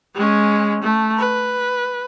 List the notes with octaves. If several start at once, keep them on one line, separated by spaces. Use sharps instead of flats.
G#3 C#4
A3
B4